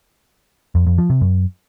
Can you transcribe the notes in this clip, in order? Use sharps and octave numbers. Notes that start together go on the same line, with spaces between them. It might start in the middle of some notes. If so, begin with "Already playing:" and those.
F2
F2
F3
C3
F#2